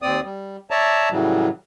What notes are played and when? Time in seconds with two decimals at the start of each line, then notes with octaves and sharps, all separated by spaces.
0.02 D#2 C4 D5 D#6
0.25 G3
0.71 C#5 D5 E5 A5 A#5
1.11 A2 C#3 E3 F#3 G3